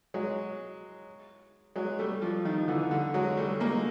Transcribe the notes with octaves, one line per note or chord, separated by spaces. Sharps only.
F#3 G#3
F#3 G#3
G3 A3
F3 G3
D#3 F3
D3 E3
D3
F#3 G#3
G3 A3
G#3 A#3